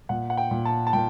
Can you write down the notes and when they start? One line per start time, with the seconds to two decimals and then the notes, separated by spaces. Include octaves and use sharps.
0.09 A#2 F#5
0.30 F#5
0.37 G5
0.51 A#2
0.65 A5
0.87 A5
0.93 A#2 G5